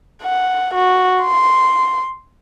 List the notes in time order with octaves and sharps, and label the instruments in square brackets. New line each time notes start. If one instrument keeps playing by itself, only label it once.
[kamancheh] F#5
F#4
C6